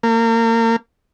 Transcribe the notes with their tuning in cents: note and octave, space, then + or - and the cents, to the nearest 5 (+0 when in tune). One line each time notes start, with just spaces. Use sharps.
A#3 -35